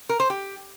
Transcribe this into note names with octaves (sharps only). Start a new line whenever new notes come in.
A#4
C5
G4